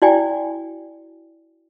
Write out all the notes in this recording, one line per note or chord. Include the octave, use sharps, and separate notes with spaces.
E4 F#4 D5 G5 G#5